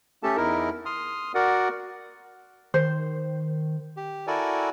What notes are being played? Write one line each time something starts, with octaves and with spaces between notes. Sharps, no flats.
A3 C#4 G4 A4 A5
E2 D#4 E4 A#4
C6 D#6 F6
F#4 A#4 D5 F#5
D#3 C5
G4
E4 F#4 A4 A#4 D5 G#5